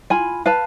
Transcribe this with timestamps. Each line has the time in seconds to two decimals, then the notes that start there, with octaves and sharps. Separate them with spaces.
0.10 F4 G#5 B5
0.46 B4 F5 A5